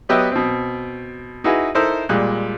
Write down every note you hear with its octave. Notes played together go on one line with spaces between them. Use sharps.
F#3 B3 G4 B4 D#5 E5
B2 C4
D#4 E4 F#4 G#4 B4
D#4 E4 A4 A#4 C5
A#2 G3 G#3 F#6